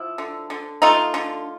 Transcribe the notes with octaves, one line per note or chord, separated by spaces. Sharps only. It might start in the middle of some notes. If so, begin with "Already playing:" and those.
Already playing: F3 E4
D3
D3
A3 D#4 F4
D3